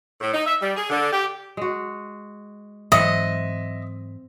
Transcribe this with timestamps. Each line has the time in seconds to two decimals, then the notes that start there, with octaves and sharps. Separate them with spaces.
0.20 A2
0.33 D#4
0.46 E5
0.60 G3
0.75 G#4
0.90 D3
1.11 G4
1.57 G#3 F#4
2.92 G#2 E3 F#3 C4 D#5 E5 F#5